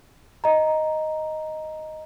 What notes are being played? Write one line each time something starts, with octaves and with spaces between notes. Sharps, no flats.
D#5 A#5